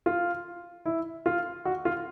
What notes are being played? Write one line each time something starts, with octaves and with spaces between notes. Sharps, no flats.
F4
E4
F4
F#4
F4